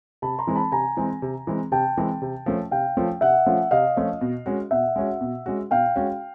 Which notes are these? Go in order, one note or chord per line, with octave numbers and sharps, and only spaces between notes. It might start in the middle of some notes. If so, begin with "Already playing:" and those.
C3 A5 B5
A#5 C6
E3 G#3 C4
A5 B5
C3 G#5 A#5
E3 G#3 C4
C3
E3 G#3 C4
C3 G5 A5
E3 G#3 C4
C3
F3 A3 C#4 F4
C3 F5 G5
F3 A3 C#4 F4
C3 E5 F#5
F3 A3 C#4 F4
C3 D#5 F5
F3 A3 C#4 F4
B2
G#3 C#4 F#4
B2 E5 F#5
G#3 C#4 F#4
B2
G#3 C#4 F#4
B2 F5 G5
G#3 C#4 F#4